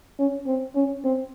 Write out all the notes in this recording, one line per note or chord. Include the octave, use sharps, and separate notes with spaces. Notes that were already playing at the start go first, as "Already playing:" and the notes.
C#4
C4
C#4
C4